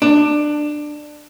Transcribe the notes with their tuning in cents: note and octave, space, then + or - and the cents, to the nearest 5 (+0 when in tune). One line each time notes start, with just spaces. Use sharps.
D4 +15